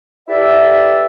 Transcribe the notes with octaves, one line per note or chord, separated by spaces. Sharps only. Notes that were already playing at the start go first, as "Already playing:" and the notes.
E4 G4 A4 B4 D5 E5